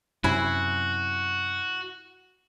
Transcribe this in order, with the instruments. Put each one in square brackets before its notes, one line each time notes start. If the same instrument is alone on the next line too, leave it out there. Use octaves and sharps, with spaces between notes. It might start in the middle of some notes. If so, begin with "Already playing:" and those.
[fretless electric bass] F#2 C3 [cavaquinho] E4 G#5 C6 [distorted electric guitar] F#4